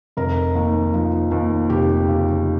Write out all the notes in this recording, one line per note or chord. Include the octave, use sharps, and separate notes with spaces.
F1 A#4
D#2
F3
D#2
F1 G4
C#3